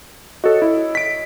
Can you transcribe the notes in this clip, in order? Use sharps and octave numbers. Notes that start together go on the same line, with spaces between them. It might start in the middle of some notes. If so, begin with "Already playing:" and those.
F#4 A4 C#5 D#5
E4
B6 D7